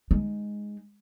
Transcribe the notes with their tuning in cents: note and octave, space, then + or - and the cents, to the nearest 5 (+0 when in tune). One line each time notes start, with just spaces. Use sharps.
G#3 +0 D#4 +0